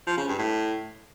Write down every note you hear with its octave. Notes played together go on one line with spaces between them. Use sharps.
F3
C#3
G2
A2